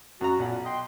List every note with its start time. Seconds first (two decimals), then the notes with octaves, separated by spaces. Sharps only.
0.21 F#2 F#4 A#5
0.39 B1 A#2 F#5
0.65 D#5 G5 C6